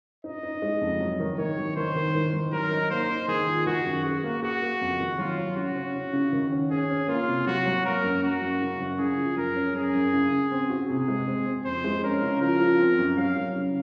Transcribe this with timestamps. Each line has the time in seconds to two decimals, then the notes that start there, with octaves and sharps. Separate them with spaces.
0.24 D#4 D#5
0.43 D#4
0.62 G#3
0.81 F2
1.00 F#3
1.20 D#3
1.38 D#3 C#5
1.57 F#3
1.76 D#3 C5
1.95 D#3
2.15 D#3
2.34 D#3
2.52 F#3 A#4
2.71 D#4
2.90 A#3 C5
3.10 D#4
3.28 D#3 G#4
3.48 F4
3.66 D#3 F#4
3.85 F#2
4.04 F#4 G#4
4.24 A#3
4.42 F#4 G#4
4.62 A#3
4.81 F2
5.00 D#3
5.18 F#3 F4
5.38 F#3
5.57 C#3 F#4
5.76 C#4
5.95 C#3
6.13 C#3
6.33 D#3
6.52 C#4
6.71 C#4 G#4
6.90 C#4
7.08 A#3 F4
7.28 C3
7.47 F#3 F#4
7.66 F#3
7.85 A#3 A#4
8.04 F#2
8.23 F#2 F#4
8.42 F#2
8.61 C#3
8.80 F#2
8.99 C#3 G#4
9.18 F3
9.37 F#2 A#4
9.56 C#4
9.74 F#2 G#4
9.95 F#2
10.13 C#3
10.32 C#3
10.51 C4
10.70 F#4
10.89 C3 G#4
11.08 G#3
11.27 C4
11.46 C4
11.65 F2 C5
11.84 G#3
12.04 C#4 A#4
12.22 C#3
12.41 F3 A#4
12.60 F3
12.80 C4
12.99 F#2
13.17 F#3 F5
13.36 F#3
13.56 C#3